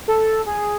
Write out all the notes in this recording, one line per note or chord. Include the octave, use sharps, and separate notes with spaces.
A4
G#4